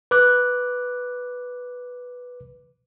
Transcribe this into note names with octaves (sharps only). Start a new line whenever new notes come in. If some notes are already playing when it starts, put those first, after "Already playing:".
B4 D6 F#6